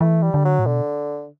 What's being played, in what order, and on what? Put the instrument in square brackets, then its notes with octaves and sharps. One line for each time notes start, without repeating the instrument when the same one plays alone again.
[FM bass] E3 [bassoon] A3
[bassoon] G3
[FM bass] D3
[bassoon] F#3
[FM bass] A2
[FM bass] B2 [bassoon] D3